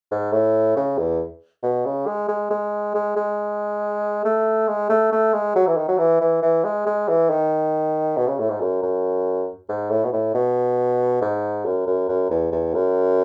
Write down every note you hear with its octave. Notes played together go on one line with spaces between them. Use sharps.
G#2
A2
C#3
E2
B2
C#3
G#3
G#3
G#3
G#3
G#3
A3
G#3
A3
A3
G#3
F#3
E3
D#3
F#3
E3
E3
E3
G#3
G#3
E3
D#3
B2
C#3
A2
G#2
F#2
F#2
G#2
A2
B2
A2
B2
G#2
F#2
F#2
F#2
E2
E2
F#2